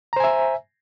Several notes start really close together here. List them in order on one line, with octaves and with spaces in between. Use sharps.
A#5 C5 G#5 E5